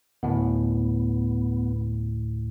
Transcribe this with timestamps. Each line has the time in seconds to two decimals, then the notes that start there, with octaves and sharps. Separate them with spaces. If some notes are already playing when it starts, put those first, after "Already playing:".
0.23 D2 A2 B3